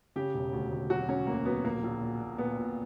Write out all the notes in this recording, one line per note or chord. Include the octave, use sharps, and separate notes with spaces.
C#3 G4
E1
D2
D2
F#3 F#4
F#3 C#4
D2 A#3
F#3 B3
A#1 A#3
A#1
A#2
A#2
A#2 B3
A#2